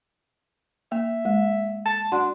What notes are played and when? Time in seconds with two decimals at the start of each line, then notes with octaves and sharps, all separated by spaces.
0.92 A#3 E5
1.25 G#3
1.85 A5
2.12 D4 F#4 F#5 C6